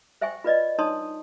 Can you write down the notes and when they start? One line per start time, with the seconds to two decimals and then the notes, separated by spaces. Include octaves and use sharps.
0.21 C5 E5 G5 G#5 C#6
0.44 F4 B4 D5 D#5
0.78 D4 D#4 C#5 A5 C6 D#6